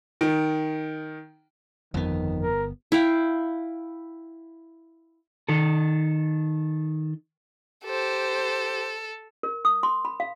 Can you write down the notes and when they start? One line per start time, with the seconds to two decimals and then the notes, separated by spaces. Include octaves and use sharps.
0.21 D#3
1.94 G1 F2 D#3 B3
2.40 A#4
2.92 E4 F5 G5
5.49 D#3 A4
7.85 G4 A4 C5
9.43 A#4
9.65 D#6
9.83 C6
10.05 B5
10.20 F5